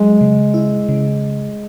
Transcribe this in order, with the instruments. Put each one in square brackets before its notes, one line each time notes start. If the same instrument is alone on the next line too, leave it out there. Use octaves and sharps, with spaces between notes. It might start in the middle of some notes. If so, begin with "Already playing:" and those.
Already playing: [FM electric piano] F#3 [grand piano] G#3
[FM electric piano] C#3
E4
C#3